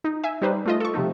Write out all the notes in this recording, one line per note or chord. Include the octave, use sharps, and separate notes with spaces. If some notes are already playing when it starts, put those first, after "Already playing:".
D#4
E5 G#5
G3 D#4 B4 C5
A3 F4 D#5
A4 C#6
C3 F3 A3 D#4